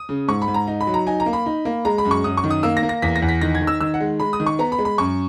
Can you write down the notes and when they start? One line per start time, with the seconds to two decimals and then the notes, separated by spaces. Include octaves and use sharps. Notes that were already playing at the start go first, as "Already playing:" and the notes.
Already playing: D#6
0.09 C#3
0.28 G#2 C#6
0.42 B5
0.48 G#2
0.54 A#5
0.67 D#4
0.81 B5
0.87 F#3
0.94 A#5
1.07 D#4 G#5
1.20 A#5
1.26 A#3
1.33 B5
1.46 D#4
1.65 A#3
1.85 G#3 A#5
1.98 B5
2.05 F#2
2.11 C#6
2.24 F#2 D#6
2.37 C#6
2.44 D#3
2.51 D#6
2.63 A#3 E6
2.77 A#6
2.83 A#3
2.89 A#6
3.02 E2 B6
3.16 A#6
3.22 E2
3.29 B6
3.41 D#3 A#6
3.55 G#6
3.61 D#3
3.67 E6
3.80 D#3 E6
3.94 F#5
4.00 G#3
4.20 G#3 B5
4.33 D#6
4.40 D#3
4.46 C#6
4.59 B3 A#5
4.72 B5
4.79 G#3
4.85 B5
4.98 F#2 C#6